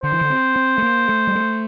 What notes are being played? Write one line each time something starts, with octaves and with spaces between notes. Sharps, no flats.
D3 C5
E3
D3
C4
C4
A3
A#3
A3
G3
A3